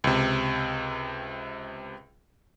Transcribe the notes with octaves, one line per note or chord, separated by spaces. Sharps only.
C#2 C3